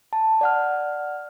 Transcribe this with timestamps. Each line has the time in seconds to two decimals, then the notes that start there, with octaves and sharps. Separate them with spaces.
0.13 A5
0.41 D5 F#5 F6